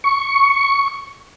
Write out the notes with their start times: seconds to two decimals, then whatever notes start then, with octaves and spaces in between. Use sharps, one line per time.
0.04 C#6